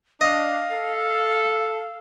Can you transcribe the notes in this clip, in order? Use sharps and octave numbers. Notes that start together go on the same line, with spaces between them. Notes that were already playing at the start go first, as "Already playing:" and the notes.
D4 D#5 F5
A4